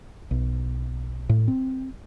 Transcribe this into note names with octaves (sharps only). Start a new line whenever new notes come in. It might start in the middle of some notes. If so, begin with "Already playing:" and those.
B1
A2
C4